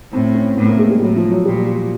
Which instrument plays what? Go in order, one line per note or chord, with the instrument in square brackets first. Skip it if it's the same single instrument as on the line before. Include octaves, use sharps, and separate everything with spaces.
[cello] A2 [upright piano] C4
[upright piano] C#4
[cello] A2 [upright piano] B3
[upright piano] A#3
G#3
G3
[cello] A2 [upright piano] F#3
[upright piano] F3
F#3
[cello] A#2 [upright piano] G3